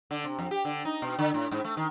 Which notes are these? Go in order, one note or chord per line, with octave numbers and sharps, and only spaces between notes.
D3
C3
F2
G4
D3
D#4
B2
D3
A2
G#2
A3
D#3